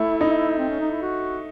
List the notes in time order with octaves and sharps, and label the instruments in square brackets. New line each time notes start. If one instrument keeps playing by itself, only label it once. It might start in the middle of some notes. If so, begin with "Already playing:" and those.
Already playing: [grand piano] A3 [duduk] E4
[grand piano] D#4
[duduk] C4
C#4
D#4
E4
F#4